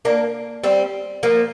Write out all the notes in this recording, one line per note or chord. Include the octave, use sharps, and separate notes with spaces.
A#3 D4
G3 C4
F3 A#3